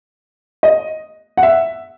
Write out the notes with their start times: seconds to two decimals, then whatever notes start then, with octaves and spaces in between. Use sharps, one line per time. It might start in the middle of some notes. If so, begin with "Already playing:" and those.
0.63 D#5
1.37 F#5
1.43 E5